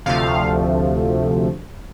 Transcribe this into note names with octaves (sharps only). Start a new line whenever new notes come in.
D2 C3 F3 A3 F5